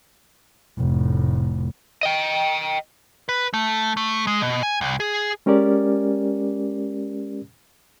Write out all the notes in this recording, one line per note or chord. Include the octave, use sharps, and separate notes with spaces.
F1 A2
D#5 G5
B4
A3
A3
G#3
B2
G#5
C2
G#4
G#3 C#4 G4 A#4 D5